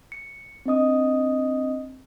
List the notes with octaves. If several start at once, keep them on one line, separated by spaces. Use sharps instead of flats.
C#7
C4 D4 D#5 D#6